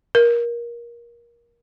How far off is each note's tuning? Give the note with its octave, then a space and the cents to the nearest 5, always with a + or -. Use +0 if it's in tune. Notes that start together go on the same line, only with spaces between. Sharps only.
A#4 +20